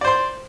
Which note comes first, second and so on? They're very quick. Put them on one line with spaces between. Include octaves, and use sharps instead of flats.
D5 C5 C6